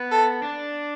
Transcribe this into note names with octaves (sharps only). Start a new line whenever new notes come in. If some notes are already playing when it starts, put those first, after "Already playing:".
Already playing: B3
A4
D4